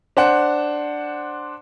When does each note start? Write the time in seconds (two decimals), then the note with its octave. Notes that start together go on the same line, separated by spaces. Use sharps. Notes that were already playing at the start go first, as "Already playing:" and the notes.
0.17 D4 C5 F#5